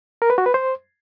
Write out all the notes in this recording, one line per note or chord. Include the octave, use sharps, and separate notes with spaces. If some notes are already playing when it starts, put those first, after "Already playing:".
A#4
B4
F#4
B4
C5